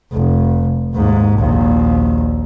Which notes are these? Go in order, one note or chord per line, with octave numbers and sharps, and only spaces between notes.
F1
D#2 G#2
A#1 D#2